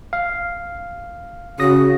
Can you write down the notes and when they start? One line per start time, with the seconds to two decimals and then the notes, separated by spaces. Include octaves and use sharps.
0.13 F5
1.60 C#3 F#4 D#6 A#6